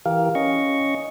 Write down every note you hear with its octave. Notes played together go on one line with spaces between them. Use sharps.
E3 G4 A#4 F5
C#4 D#5 C#6